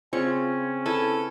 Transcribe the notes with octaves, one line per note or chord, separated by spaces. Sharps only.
C#3 C4 C#4 F4 C#6
E4 A4 B4 G#5